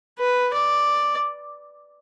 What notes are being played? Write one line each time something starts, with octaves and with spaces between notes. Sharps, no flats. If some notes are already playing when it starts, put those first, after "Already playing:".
B4
D5